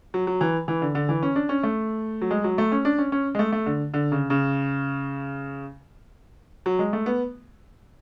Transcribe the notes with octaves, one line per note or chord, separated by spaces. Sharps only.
F#3
F#3
E3
E3
D3
D3
E3
C#4
D4
C#4
A3
F#3
G#3
F#3
A3
C#4
D4
C#4
C#4
G#3
A3
A3
D3
D3
C#3
C#3
F#3
G#3
A3
B3